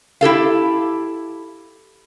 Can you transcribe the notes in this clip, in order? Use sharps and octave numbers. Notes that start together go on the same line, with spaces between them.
E4 G4 A4 F5